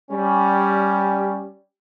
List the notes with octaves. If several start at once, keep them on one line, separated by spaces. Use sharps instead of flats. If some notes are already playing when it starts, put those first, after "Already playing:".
G3 C#4